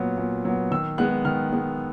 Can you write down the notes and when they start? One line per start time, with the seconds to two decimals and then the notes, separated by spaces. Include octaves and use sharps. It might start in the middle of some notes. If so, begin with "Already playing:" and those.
Already playing: A#2 F#3 B3
0.18 A#2
0.45 F#3 B3
0.71 D#3 E6
0.98 G#3 B3 F#6
1.25 D#3 F6
1.53 G#3 B3